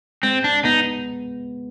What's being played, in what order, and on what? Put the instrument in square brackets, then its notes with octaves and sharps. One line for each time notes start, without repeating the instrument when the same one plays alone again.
[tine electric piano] G#3 [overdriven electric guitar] C4
[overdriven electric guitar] D4
[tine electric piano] B3 [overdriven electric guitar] D#4